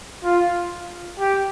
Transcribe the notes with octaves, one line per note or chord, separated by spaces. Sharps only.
F4
G4